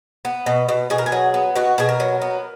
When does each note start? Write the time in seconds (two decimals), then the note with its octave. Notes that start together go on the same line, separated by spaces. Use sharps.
0.25 B3
0.46 B2
0.69 B2
0.90 B2 G#4
0.98 A#4
1.06 G#4
1.12 F#3
1.34 B3
1.56 B2 F#4
1.78 B2 G#4
1.89 A#4
2.00 F#3
2.22 B3